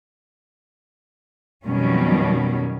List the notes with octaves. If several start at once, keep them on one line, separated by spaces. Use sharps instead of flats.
F2 B2 D#3 F#3 G3 C#4